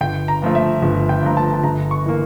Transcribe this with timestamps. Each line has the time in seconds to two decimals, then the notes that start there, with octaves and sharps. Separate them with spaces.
0.01 G1 G5
0.28 A#5
0.42 G2 F3 A3
0.55 E5
0.82 G1
1.09 G5
1.22 G2 F3 A3 A#5
1.37 A5
1.54 A5
1.64 G1 A#5
1.91 C#6
2.06 E3 A#3